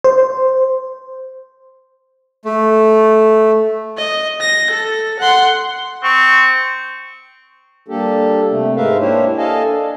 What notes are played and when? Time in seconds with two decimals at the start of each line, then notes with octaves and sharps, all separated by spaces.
0.04 C5
2.45 A3
3.98 D#5
4.40 A#6
4.70 A4
5.19 F#5 C6
6.04 C4 C#6
7.88 G3 A#3 D4 G4 A4
8.50 C3 A3
8.76 G#2 G#3 A#4 B4 E5 F5
8.99 A#3 D4 E4 G4 C5 C#5
9.37 A4 D#5 F5 G#5 A5
9.66 D4